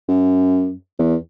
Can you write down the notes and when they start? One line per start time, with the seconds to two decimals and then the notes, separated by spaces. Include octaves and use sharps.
0.08 F#2
0.99 E2